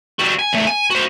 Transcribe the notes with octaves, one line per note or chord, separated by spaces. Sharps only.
G3 F#4
G#5
E2 A3
G#5
F#4 C5